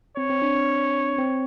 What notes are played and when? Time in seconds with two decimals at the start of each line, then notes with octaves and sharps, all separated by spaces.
0.17 C4 C#5
0.30 C4
0.42 D4
0.55 C4
1.18 C4